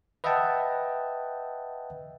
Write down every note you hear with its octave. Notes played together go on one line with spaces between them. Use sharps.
B4 D#5 E5 F#5 G5 A5